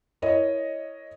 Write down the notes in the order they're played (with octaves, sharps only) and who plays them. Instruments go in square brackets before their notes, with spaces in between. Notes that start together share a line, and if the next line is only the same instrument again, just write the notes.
[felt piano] E4 A#4 C#5 D#5